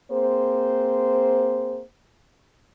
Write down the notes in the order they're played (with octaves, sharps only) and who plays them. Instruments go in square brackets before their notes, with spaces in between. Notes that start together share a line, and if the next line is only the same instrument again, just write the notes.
[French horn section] A#3 C4 G#4 C5